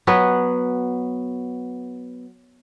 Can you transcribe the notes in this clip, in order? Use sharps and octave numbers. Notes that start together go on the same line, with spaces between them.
F#3 B3 B4